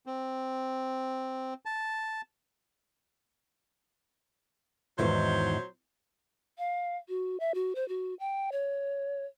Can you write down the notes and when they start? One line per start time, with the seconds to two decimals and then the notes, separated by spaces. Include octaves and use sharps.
0.06 C4
1.65 A5
4.99 E2 G#2 D#3 F#3 C5
6.58 F5
7.09 F#4
7.40 E5
7.55 F#4
7.75 C5
7.89 F#4
8.20 G5
8.52 C#5